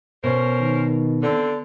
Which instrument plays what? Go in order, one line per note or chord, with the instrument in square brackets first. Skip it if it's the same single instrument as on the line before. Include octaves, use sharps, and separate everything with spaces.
[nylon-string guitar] B2 [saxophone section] C#4 A#4 C5
[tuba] D#3
[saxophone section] D3 C4